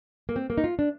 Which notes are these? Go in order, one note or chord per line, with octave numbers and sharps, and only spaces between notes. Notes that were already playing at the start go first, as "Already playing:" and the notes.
A#3
C4
A#3
D#4
F4
D4